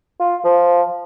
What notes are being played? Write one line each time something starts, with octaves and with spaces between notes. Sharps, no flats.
F4
F3